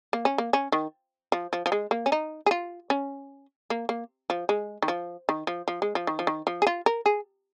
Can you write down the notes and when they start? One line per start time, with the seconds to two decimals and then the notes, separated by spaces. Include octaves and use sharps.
0.13 A#3
0.25 C#4
0.38 A#3
0.53 C#4
0.72 D#3
1.32 F3
1.53 F3
1.66 F3
1.72 G#3
1.91 A#3
2.06 C#4
2.12 D#4
2.46 G#4
2.51 F4
2.90 C#4
3.70 A#3
3.89 A#3
4.30 F3
4.49 G#3
4.82 D#3
4.88 F3
5.29 D#3
5.47 F3
5.68 F3
5.82 G#3
5.95 F3
6.07 D#3
6.19 F3
6.27 D#3
6.47 F3
6.62 G#4
6.67 F4
6.86 A#4
7.06 G#4